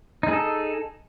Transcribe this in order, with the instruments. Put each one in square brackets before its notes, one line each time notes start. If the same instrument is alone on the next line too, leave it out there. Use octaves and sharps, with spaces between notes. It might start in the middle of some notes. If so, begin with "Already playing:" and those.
[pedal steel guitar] D#4
G#4
A4